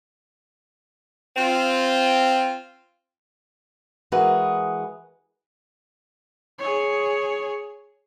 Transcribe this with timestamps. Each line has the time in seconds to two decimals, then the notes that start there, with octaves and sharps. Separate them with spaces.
1.36 C4 F4
4.12 E3 G#3 F#4 G#4 A#4 B4
6.59 G#4 C#5